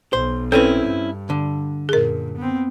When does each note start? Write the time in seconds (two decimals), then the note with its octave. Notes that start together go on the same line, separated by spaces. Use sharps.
0.13 B1 C5
0.52 C4 C#4 E4 A4 B4
0.86 G2
1.30 D3
1.89 F#2 A#2 G#4 A#4
2.37 B3 C4